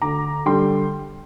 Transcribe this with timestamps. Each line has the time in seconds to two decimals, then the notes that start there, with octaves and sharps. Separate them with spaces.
0.02 D2 A#5 D6
0.46 D3 G3 G5 C6